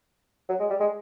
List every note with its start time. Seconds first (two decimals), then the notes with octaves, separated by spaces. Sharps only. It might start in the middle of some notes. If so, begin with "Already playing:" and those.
0.49 F#3
0.60 G#3
0.70 G3
0.80 G#3